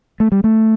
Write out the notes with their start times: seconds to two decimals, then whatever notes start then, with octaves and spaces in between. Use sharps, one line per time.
0.20 A3
0.32 G3
0.44 A3